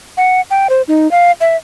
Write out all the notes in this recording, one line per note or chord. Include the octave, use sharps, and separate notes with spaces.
F#5
G5
C5
D#4
F5
E5